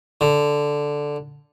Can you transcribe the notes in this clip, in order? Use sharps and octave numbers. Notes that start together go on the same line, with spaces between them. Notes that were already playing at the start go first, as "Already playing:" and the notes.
D3